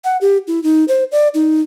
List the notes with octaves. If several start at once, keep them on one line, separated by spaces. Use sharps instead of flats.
F#5
G4
E4
D#4
C5
D5
D#4